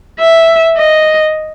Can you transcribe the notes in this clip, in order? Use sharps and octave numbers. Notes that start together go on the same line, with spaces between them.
E5
D#5